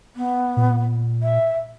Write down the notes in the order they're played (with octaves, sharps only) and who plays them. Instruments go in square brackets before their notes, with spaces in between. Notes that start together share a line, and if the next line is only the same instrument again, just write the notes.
[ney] B3
[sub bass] A#2
[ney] E5